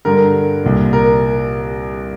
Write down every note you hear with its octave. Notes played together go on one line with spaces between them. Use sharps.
G2 D3 A#4
C2 A#2
A#4